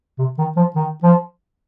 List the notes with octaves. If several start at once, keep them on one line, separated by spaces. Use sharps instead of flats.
C3
D#3
F3
D#3
F3